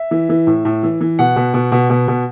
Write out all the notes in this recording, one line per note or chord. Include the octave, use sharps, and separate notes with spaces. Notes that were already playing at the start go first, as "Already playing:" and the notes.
Already playing: E5
E3
E3
A2
A2
E3
E3
B2 F#5
B2
B2
B2
B2
B2